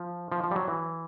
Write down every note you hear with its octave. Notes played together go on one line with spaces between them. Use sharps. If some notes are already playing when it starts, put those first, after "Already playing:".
Already playing: F3
F3
F3
G3
F#3
E3